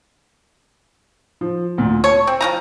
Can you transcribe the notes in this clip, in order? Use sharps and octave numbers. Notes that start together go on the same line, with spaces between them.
F3
D2 A#2
C#5 A5
C4
F3 D#4 A#5